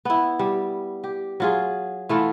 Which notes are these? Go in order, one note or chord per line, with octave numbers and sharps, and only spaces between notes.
B3 E4
G3
G4
F#3 F4 G#4
E3 A3 B3 F4